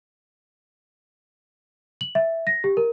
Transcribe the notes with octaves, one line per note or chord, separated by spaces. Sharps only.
F#7
E5
A#6
G4
A#4